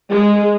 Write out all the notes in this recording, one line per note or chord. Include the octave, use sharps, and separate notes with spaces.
G#3